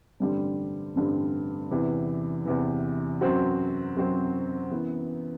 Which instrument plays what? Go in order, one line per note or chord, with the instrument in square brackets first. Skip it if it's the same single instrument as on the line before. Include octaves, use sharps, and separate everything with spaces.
[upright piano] A1 G2 D3 G3 C4
A1 G2 D3 G3 C4
E2 C3 E3
E2 C3 E3
F#2 F#3 C4 F#4 C5
F#2 F#3 C4 F#4 C5
F#2 E3 B3